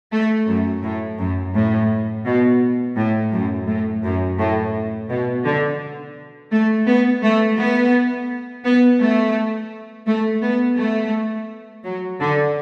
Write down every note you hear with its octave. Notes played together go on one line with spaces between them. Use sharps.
A3
F#2
A2
F#2
A2
B2
A2
F#2
A2
F#2
A2
B2
D3
A3
B3
A3
B3
B3
A3
A3
B3
A3
F#3
D3